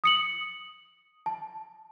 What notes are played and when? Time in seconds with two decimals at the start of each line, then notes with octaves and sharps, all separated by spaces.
0.04 D#6 C#7 F#7
1.26 A5